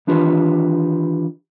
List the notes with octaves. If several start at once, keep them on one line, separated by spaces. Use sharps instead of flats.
D#3 E3 D4 F4 G4 B4